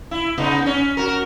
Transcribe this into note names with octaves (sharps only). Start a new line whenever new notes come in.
E4
C#3 B3 D#4
C#4
F#4 A#4